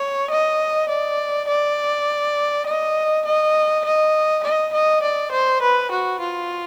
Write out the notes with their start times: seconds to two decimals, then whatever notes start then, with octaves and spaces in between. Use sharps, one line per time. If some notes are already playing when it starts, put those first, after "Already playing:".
Already playing: C#5
0.30 D#5
0.89 D5
1.48 D5
2.66 D#5
3.25 D#5
3.85 D#5
4.43 D#5
4.73 D#5
5.03 D5
5.32 C5
5.62 B4
5.91 F#4
6.20 F4